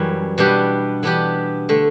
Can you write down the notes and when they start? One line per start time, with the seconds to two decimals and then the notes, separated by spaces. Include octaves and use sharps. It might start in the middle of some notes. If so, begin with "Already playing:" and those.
Already playing: F#2 E3 G3 C#4
0.38 B2 G3 B3 D4 G4
1.03 E3 B3 D4 G4
1.69 D3 A3